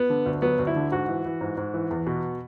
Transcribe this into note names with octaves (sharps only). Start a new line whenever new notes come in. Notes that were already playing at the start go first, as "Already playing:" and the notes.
Already playing: B3
D3
D2
F#3 B3
D2
E4
D3
G#2 F#4
E3
E3
G#2
G#2
E3
E2
B2